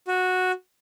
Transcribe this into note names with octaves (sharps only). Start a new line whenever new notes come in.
F#4